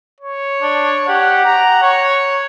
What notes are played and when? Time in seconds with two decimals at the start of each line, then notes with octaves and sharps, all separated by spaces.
0.20 C#5
0.62 D4
1.08 G4 F#5
1.45 A#5
1.82 C#5